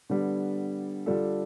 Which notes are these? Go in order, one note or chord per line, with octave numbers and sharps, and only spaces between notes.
D3 G3 B3
D3 G3 D4 F4 A4